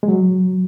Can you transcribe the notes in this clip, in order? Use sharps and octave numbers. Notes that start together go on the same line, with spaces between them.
G#3
F#3